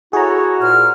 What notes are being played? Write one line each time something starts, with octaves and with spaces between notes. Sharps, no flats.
E4 F#4 G#4 A4 C#5 A#5
A#2 C5 F6